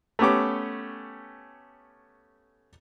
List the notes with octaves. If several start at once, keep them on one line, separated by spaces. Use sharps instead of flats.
A3 B3 C#4 G4 D6